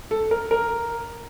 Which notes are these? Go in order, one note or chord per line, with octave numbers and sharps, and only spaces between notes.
A4
A#4
A#4